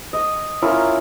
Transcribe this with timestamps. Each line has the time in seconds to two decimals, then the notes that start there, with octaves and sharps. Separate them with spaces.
0.13 D#5
0.62 C#4 E4 F4 A#4